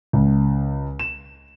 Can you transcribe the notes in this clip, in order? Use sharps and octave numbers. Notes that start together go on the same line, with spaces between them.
C#2
E7